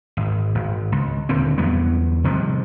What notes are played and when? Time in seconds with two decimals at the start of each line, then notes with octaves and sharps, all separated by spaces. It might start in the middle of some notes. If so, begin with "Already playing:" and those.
0.17 G#1
0.55 G#1
0.92 C#2
1.29 D#1 D#2 D3 C4
1.58 E2 F#3 G3 B3
2.24 C3 D#3 F3 G3